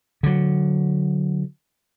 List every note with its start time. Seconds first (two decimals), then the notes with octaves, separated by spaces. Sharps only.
0.23 D3 F#3